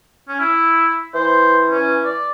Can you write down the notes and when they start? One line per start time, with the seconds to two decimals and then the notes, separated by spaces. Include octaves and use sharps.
0.29 C#4
0.40 E4
1.14 E3 C5
1.71 C#4
2.05 D5